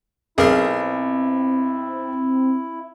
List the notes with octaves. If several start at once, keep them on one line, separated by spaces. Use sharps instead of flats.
B1 C4 E4 G#4 A#4